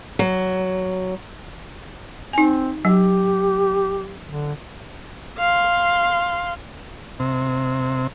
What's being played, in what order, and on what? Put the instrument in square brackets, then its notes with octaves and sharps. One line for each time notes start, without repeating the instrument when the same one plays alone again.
[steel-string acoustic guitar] F#3
[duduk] C4 [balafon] D#4 G#5
[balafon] F#3 [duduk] G4
[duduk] D3
[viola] F5 C6
[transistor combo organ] C3